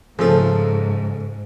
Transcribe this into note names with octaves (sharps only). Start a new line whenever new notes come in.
G#2 C#3 F3 A3 A4